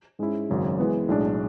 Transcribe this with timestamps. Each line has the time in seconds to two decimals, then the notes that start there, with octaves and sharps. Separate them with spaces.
0.19 G#2 G#3 C#4 E4
0.50 G#1 F#2 C#3
0.79 E3 G#3 B3
1.08 B1 A2 G#3 D4